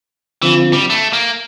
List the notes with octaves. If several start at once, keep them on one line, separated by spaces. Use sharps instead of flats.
D3 E3 F3 C4 F4
G3
A3
A#3